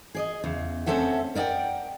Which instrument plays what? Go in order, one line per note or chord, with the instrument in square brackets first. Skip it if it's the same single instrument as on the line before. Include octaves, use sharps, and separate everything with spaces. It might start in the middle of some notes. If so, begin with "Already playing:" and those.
[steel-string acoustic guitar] G#4 D5 D#5
E2 C#3
A3 C4 C#4 A4 E5 F#5
A#4 D5 D#5 F#5 G5